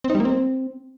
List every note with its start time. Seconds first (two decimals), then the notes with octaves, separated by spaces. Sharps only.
0.04 C4
0.10 D#4
0.15 G3
0.20 A#3
0.25 C4